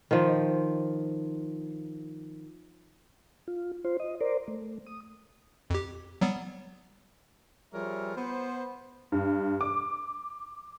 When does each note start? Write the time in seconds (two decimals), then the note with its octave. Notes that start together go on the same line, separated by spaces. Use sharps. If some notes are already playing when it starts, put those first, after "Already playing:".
0.11 D#3 F3
3.48 F4
3.85 F4 C5
4.00 D#5
4.21 A#4 C5 D5
4.48 A3
4.86 D#6
5.70 F2 G4
6.21 F#3 G3 B3
7.73 F3 G3 G#4 A#4 C#5 E5
8.16 B3 C5
9.12 G2
9.61 D6